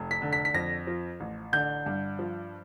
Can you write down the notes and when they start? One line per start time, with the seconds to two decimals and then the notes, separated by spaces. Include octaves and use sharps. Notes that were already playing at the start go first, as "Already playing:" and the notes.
Already playing: F1
0.11 B6
0.22 D3
0.33 B6
0.45 B6
0.54 F2 A#6
0.87 F3
1.20 A1
1.53 D3 G6
1.86 G2
2.19 F3